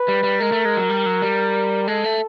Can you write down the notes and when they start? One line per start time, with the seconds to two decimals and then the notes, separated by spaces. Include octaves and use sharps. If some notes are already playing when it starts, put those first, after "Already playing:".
Already playing: B4
0.08 G3
0.23 G3
0.40 G#3 A#4
0.52 A3
0.65 G#3
0.77 F#3
0.90 G3
1.06 F#3
1.22 G3
1.87 G#3 A4
2.04 A3